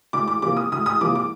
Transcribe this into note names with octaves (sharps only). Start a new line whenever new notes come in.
D2 D6
D6
C3 F3 A#3 D6
D#6
D2 D#6
D#6
C3 F3 A#3 D6
D6